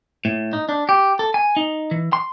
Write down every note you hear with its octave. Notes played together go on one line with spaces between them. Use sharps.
A2
D#4
D4
G4
A4
G#5
D#4
E3
C6